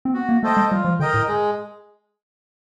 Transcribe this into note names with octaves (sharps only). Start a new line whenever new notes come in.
C4
B3 F#4
A#3
A3 A4 C5 D#5 G5
G#3
G3 F4
F3
D3 A#4 D#5 G5
A2
G#3